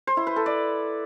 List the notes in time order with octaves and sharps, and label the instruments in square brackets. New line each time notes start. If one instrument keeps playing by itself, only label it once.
[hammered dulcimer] C5
E4
B4
A4
D5